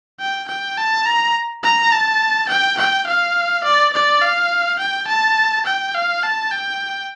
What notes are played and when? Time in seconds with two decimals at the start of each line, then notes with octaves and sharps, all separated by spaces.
0.20 G5
0.48 G5
0.78 A5
1.06 A#5
1.64 A#5
1.92 A5
2.49 G5
2.78 G5
3.07 F5
3.64 D5
3.93 D5
4.22 F5
4.79 G5
5.07 A5
5.66 G5
5.95 F5
6.23 A5
6.51 G5